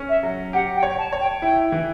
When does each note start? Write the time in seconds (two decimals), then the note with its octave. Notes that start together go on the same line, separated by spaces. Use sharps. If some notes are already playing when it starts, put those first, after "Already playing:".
Already playing: C#4
0.09 E5
0.23 F#3
0.53 G4 F#5
0.76 G5
0.83 C#5
0.98 A5
1.13 C#5
1.20 G5
1.42 E4 G5
1.72 E3